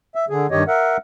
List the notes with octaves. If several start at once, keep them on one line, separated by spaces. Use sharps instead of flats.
E5
D3 G#4
G2 D#3 G4 C#5 D#5
A#4 E5 F#5